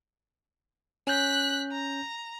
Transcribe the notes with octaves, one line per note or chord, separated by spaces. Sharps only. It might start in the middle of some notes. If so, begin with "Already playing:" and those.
C#4 F#6 G6 B6
A#5